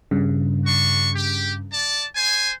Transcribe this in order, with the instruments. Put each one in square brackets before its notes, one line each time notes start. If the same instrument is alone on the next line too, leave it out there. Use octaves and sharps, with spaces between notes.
[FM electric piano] G2 C#3
[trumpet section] D4 F#4 C#6
G4
D5 A5
C5 G#5